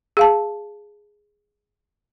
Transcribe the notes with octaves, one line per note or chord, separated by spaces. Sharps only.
G#4 F5 A5